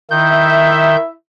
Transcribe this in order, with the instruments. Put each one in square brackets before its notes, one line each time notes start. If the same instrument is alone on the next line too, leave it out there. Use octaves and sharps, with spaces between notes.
[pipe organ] D#3 G6 [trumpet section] E4 E5